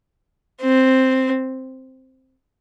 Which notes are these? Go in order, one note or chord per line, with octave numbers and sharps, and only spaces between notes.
C4